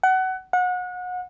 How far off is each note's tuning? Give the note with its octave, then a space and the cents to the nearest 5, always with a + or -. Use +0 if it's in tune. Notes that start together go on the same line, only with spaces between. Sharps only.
F#5 +25
F#5 -30